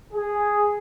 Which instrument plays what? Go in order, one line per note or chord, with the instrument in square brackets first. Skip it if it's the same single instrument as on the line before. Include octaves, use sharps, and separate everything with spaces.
[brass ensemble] G#4